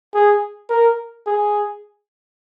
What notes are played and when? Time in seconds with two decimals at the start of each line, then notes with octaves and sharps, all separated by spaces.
0.14 G#4
0.70 A#4
1.26 G#4